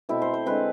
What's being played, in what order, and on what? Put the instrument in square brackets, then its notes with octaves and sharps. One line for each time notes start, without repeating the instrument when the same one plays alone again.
[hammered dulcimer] B2 A3 C4 E4
C5
C5
D3 G#3 C4 B4